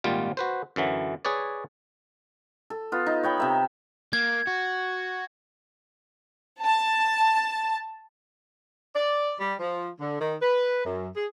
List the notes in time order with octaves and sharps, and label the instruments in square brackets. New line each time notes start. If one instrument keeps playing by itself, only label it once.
[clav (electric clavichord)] G#1 A#2 G3 F4
F#4 B4 C5
F#2 D3 E3 F#3
G#4 B4 C#5 D5
[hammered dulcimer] A4
B3 F4
D#4
C#5 G5 B5
C3 E5 A#5
[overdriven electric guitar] A#3 [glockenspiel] G#6
[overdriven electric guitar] F#4
[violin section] A5
[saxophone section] D5
G3
F3
D3
D#3
B4
F#2
G#4